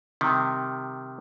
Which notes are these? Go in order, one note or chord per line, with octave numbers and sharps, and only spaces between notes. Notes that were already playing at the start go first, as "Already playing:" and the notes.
C3 D#3 G3